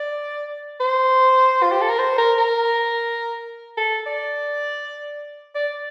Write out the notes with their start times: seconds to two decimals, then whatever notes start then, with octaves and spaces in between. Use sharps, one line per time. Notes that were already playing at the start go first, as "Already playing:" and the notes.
Already playing: D5
0.80 C5
1.62 F4
1.71 G4
1.81 A4
1.89 A#4
1.99 C5
2.18 A#4
2.38 A#4
3.77 A4
4.06 D5
5.55 D5